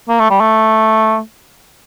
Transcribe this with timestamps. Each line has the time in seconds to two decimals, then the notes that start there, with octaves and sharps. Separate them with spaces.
0.09 A#3
0.20 A3
0.30 G3
0.40 A3